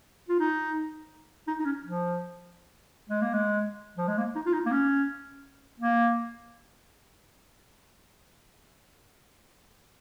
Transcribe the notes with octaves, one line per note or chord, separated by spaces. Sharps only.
F4
D#4
D#4
D#4
C#4
F3
G#3
A#3
G#3
F3
G#3
A#3
D#4
F4
D#4
A#3
C#4
A#3